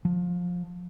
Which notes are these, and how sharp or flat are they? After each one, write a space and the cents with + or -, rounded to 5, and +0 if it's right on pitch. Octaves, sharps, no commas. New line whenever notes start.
F3 +20